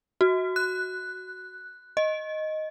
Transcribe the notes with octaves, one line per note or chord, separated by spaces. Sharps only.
F#4
F#6
D#5